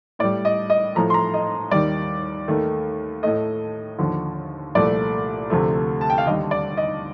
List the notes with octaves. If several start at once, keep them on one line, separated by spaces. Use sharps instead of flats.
A2 G3 D5
D#5
D#5
A2 F3 A3 A#5
C6
A#5
D#5
D#2 D#3 G3 D5
D#2 D#3 A3
A2 A3 D#5
D#2 D3 F3
C2 A#2 F3 A3 D5
D2 C3 F3 A3
A5
G5
F5
D#2 D3 G3 D#5
D5
D#5